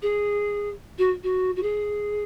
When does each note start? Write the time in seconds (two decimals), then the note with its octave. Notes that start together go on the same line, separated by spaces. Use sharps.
0.02 G#4
0.98 F#4
1.23 F#4
1.56 F#4
1.63 G#4